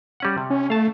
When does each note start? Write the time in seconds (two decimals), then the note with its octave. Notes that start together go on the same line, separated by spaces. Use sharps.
0.20 G3 C#4 F#5
0.38 C3
0.50 C#4
0.70 A3 F5 A5